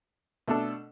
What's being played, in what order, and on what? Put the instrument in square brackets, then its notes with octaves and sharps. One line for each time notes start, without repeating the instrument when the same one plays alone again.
[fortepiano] B2 A3 D4 A4